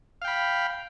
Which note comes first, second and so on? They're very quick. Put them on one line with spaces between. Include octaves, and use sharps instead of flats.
F5 G5 B5